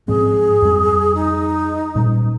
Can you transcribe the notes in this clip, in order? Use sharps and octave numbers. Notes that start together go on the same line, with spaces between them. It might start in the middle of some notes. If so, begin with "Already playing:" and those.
G#2 F3 C4 G#4
F2 G3
D#4
A#2 G3